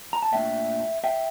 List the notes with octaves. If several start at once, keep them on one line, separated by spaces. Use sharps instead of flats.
A#5
A5
A#2 A3 D4 E5 G5
E5 G5